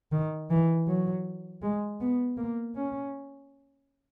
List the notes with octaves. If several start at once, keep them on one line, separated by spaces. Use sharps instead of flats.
D#3
E3
F#3
G#3
B3
A#3
C#4